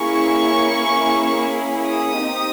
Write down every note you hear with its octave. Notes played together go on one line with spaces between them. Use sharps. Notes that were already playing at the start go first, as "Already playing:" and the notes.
Already playing: A#3 C#4 E4 G#4 C#6
D#6
C4 D#4 G4